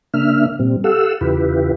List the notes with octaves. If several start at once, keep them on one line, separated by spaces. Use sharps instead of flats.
C#3 A#3 D4 E5 F6
A#2 G3 C4
G4 A4 F5 F#5 E6
E2 C#3 E4 F4 G4 B4